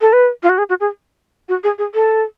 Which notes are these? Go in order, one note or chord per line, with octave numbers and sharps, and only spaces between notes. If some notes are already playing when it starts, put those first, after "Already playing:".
A4
B4
F4
F#4
G#4
F#4
G#4
F#4
G#4
G#4
A4